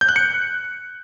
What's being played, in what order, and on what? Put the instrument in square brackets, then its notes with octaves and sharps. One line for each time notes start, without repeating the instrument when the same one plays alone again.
[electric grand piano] G6
F#6
C#7